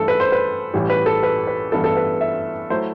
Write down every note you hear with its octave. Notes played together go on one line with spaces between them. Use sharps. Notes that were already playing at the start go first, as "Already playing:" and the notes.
Already playing: G2 E3 A3 A4
B4
C5
B4
A1 A2 E3 G3
B4
A4
B4
B4
A1 G2 E3 B3 E4 A4
A4
B4
E5
F#3 A3 E4 C5